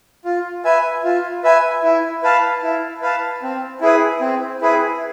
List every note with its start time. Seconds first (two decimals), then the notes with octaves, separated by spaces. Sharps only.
0.25 F4
0.65 B4 E5 G#5
1.04 F4
1.43 B4 E5 G#5
1.83 E4
2.23 B4 F5 A5
2.63 E4
3.02 B4 F5 A5
3.43 C4
3.81 E4 G#4 B4
4.21 C4
4.61 E4 G#4 B4